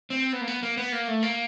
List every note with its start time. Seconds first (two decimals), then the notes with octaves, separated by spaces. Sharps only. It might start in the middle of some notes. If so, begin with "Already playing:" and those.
0.10 C4
0.33 B3
0.41 A#3
0.48 B3
0.63 A#3
0.77 B3
0.92 A#3
1.08 A3
1.23 A#3